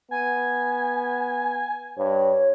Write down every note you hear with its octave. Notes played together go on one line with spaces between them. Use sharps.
B3 G#5
G2 C#5